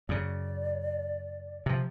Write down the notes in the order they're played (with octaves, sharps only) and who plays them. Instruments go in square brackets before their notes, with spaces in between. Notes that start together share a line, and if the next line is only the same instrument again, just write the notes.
[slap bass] F#2 C#3 [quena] D5
[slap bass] C3 F3